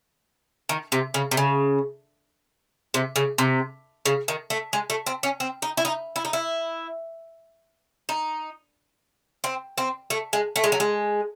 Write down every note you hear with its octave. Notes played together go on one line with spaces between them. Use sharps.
D#3
C3
C#3
C3
C#3
C3
C#3
C3
C#3
D#3
A3
G#3
A3
C4
C#4
C4
D#4
E4
D#4
E4
D#4
E4
D#4
C4
C4
A3
G#3
A3
G#3
F#3
G#3